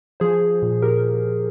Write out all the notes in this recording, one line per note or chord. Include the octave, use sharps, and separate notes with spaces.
F3 G#4 C5
F3
A#2
A#2 G4 A#4